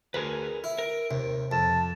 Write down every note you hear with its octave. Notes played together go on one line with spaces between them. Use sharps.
D2 G#4 A#4 B4
E4
A#4
D#2 C3
F2 A5